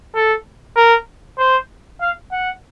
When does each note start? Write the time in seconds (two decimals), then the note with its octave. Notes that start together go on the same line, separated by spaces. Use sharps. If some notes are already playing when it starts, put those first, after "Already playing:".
0.15 A4
0.76 A#4
1.38 C5
2.01 F5
2.32 F#5